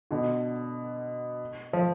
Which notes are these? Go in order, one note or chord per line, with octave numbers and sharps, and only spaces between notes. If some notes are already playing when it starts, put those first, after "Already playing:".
B2 D3
F3